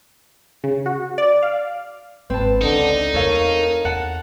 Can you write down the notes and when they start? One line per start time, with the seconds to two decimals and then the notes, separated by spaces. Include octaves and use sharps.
0.64 C#3
0.86 F#4
1.18 D5
1.42 F5
2.30 G#1 C4 F4 B4 A5
2.61 C#2 D3 D#4
3.14 E2 A3 A4 A#4 C#5 F5
3.85 E2 F#5 A5